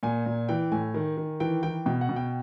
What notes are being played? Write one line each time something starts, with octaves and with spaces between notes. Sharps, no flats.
A#2 G#5
A#2
E3 G5
A2 G#5
D#3
D#3
E3 G5
E3 G5
B2 G5
F#5
B2
G5